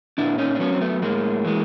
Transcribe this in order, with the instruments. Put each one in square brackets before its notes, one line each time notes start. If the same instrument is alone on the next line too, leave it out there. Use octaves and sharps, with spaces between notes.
[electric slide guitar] A#2 D4 E4
C#4 D#4
D4
F#3 B3 C#4
C4
A3 B3
A2 G#3 A#3
E3 G#3